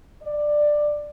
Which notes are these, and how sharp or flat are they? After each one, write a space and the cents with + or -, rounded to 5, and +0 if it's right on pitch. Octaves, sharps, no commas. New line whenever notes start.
D5 +10